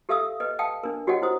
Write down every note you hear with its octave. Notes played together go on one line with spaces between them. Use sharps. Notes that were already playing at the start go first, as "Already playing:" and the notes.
G4 A4 E5 F5 D#6 E6
B4 D#5
F5 G5 A5 D#6
D4 A#4
F#4 G4 C#5 D#5 F#5 G5
E4 C5 D#6